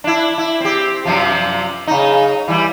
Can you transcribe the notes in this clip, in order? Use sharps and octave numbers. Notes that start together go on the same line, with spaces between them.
D4 E4
E4
C4 G4
F#2 C3 F3
C#3 D#4
E3 G3